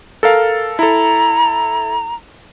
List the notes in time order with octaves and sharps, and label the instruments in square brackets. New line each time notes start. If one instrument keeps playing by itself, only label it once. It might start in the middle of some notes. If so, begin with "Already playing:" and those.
[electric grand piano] A4 A#4 F5
[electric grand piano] E4 A4 [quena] A#5